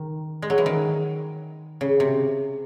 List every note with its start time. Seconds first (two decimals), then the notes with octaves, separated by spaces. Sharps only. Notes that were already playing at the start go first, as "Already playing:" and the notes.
Already playing: D#3
0.42 G#3
0.50 F#3
0.58 E3
0.66 D#3
1.81 C#3
2.00 C3